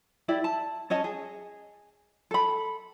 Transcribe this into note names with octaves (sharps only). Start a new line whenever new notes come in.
E4 G4 D5
A5
C#4 C#5 D#5 A5
G#4
A4 B5